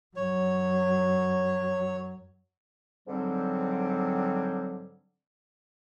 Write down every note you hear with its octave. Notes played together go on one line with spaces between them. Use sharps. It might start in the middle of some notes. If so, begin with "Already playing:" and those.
F#2 F#3 C#5
G#2 D3 F#3 G3 C4